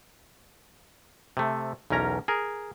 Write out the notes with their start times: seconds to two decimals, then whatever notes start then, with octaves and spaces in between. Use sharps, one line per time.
1.37 C3 A3
1.90 B1 E2 C#4 A#4 A#5
2.28 G#4 A#4